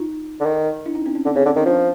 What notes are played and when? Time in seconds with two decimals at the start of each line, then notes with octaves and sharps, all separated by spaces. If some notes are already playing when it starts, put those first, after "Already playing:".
Already playing: D#4 F4
0.40 D3
0.45 D#3
0.86 D4 E4
0.95 C#4 D#4
1.06 C4 D4
1.15 C#4
1.25 D3 C4
1.36 C#3 C4
1.45 D3 C#4
1.56 D#3 C#4
1.65 F3 C4 D4